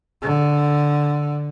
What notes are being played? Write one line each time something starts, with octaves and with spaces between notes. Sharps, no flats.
D3